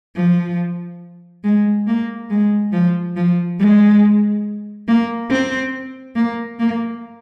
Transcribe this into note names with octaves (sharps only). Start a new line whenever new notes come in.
F3
G#3
A#3
G#3
F3
F3
G#3
A#3
C4
A#3
A#3